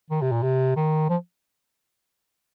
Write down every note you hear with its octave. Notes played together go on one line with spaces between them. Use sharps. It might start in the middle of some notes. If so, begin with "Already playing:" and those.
D#3
C3
A#2
C3
D#3
F3